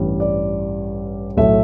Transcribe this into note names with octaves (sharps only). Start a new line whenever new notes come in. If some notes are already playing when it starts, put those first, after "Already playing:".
Already playing: A1 G2 G3
D5
B1 A2 A3 E5